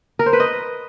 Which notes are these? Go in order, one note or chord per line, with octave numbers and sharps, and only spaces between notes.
A#4
C5
B4
D#5